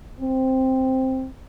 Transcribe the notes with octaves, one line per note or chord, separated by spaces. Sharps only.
C4